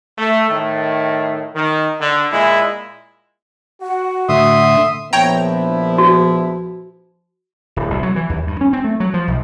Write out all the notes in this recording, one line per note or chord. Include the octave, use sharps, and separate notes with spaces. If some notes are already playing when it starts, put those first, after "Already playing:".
A3
A2 D#3
D#3
D3
A#2 G#3 E4
F#4 F#5
A2 D3 E5 C6 D#6
A#1 F3 B3 E4 C#5 G5 A#5
F#4
D1
C2
F#3
E3
D#2
G2
C#4
C4
A3
F#3
F3
B1